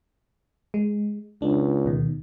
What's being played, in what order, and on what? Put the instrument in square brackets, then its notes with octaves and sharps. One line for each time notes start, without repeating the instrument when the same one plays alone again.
[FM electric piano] G#3
[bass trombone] C#2 [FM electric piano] D4
[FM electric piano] D2 B2 D#3